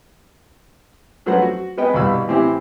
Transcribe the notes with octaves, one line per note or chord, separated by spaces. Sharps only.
F3 F#3 A3 B4 C5 F#5
F#4
G#3 B3 B4 D#5 G5
C2 G2 B2 F5 B5 E6
A2 E3 C4 E4 G4